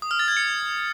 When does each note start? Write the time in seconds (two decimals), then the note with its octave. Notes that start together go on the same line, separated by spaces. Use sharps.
0.02 D#6
0.11 F6
0.19 A6
0.28 G#6
0.37 C#7